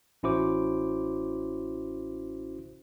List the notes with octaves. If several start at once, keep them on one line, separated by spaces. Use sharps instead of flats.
A1 C#4 E4 F#4 C5 D6